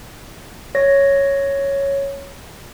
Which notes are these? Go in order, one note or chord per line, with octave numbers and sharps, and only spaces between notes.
C#5 A#6